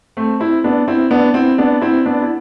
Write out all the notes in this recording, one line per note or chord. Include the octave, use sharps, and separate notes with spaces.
A3 C4
C4 E4
B3 D4
C4 E4
B3 D4
C4 E4
B3 D4
C4 E4
B3 D4
E4